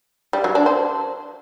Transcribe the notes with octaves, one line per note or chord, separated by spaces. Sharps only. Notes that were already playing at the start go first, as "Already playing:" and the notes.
G3
F#3
D4
C5